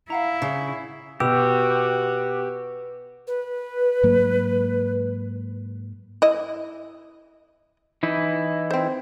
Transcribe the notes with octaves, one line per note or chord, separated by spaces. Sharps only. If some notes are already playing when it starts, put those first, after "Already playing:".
E4 F5 F#5 A#5
C#3
B2 F#4 G4 B4 E6
B4
G#2 F#3 A#3
E4 D#5
E3 D#4 E4
C4 C5